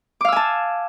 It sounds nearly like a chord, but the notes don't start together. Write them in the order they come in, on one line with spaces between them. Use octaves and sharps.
D6 F5 E6 G#5 A5